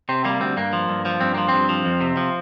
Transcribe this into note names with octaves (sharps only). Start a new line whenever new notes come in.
C3 C4
G3 A#3
D2 C4
G2 A#3
F3
G2
F3
G2 C4
F3 A#3
G2 C4
F3
F2
C3
F3